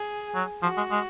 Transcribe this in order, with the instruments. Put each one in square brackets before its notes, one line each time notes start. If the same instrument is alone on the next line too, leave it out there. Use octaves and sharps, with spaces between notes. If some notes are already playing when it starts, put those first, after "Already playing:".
Already playing: [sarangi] G#4
[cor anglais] F#3
[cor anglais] F3 [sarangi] F#4
[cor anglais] G#3
G#3